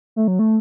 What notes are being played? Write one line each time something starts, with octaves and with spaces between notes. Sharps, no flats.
A3
F#3
A3